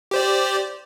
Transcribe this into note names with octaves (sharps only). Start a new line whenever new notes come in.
G4 C5 D5